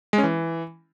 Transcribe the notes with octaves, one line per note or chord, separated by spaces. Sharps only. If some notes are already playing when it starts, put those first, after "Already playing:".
G#3
C#4
E3